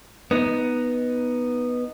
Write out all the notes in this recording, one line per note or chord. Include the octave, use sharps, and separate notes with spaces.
B3 D#4